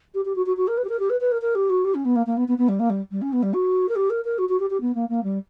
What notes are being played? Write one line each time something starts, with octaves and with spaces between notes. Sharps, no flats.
G4
G4
F#4
F#4
F#4
A#4
B4
G4
A#4
G4
B4
B4
A#4
A#4
G4
F#4
G4
C#4
B3
A#3
A#3
B3
B3
B3
G3
A#3
G3
G3
C#4
B3
G3
F#4
A#4
G4
A#4
A#4
F#4
F#4
G4
G4
B3
A#3
A#3
G3